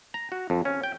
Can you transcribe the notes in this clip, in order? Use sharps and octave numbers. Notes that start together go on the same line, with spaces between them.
A#5
F#4
F2
C#4
G5